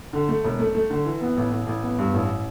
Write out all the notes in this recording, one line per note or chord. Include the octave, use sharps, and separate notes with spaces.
D3
A3
E1
A3
A3
D3
E3
B3
A1
A1
A1
B3
G2
A1